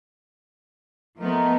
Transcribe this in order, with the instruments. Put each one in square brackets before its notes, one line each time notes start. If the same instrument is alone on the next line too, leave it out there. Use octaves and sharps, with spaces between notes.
[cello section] F3 B3 [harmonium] A3 D#4 A#4